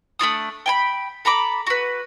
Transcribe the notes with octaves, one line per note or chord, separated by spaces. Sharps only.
A3 D4 F4 D#6
G5 G#5 B5
A4 A#5 B5 D6
F#4 B4